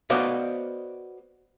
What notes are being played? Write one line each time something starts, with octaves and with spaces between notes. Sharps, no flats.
B3 F#4 C5 D5 D#5 F5